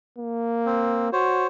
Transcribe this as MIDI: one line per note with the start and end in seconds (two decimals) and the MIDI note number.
0.19 1.11 58
0.66 1.08 60
1.13 1.48 66
1.13 1.47 72
1.13 1.47 73